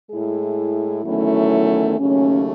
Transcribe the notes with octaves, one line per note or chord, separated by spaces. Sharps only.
A2 G#3 E4 G#4
E2 D#3 F#3 A3 C#4 E4
D#2 C#3 F#3 A3 C#4